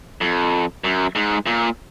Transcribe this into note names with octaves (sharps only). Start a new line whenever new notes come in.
F2
F#2
G#2
A#2